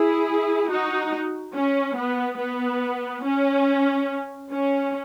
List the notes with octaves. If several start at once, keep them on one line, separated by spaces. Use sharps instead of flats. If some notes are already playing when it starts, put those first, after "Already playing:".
Already playing: E4 G#4
D#4 F#4
C#4
B3
B3
C#4
C#4